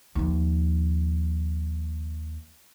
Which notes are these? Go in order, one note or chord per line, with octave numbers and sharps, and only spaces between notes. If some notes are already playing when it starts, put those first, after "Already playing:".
D#2 F3